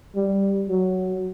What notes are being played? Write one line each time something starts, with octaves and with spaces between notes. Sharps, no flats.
G3
F#3